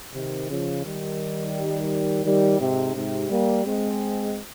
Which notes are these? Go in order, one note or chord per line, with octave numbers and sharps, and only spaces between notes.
C3 D#3
C#3 F3
D#3 G3
D#3 G3
G#2 C3
G#2 C3
G3 A#3
G#3 C4